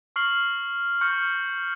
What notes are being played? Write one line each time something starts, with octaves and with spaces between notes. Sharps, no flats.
C#6 F6 C7 F#7
C#6 F6 G6 C#7